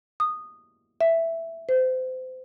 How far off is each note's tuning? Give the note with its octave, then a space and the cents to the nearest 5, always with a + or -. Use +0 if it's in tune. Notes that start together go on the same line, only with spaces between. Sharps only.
D#6 -10
E5 +5
C5 -30